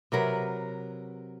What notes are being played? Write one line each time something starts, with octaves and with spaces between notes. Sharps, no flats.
C3 F#3 A#4 B4